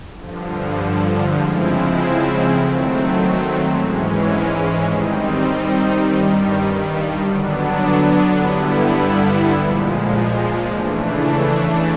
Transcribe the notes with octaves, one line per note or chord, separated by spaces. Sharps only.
G2 D3 F3
C#3 F3 G#3 C4 E4
D#3 F#3 A3 C4
G#2 E3 G#3 C#4
D#3 G3 C4 D#4
G2 D#3 G3
D3 F#3 B3 D4
G2 D3 G3 B3 E4
A#2 F3 G#3
C#3 E3 A3 D4